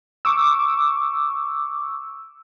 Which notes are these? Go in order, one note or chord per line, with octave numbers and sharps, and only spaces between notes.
C#6 D6 E6